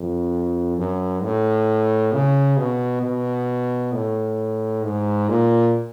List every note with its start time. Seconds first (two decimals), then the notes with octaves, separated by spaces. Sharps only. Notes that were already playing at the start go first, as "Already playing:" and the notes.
Already playing: F2
0.78 F#2
1.23 A2
2.13 C#3
2.57 B2
3.02 B2
3.92 A2
4.83 G#2
5.29 A#2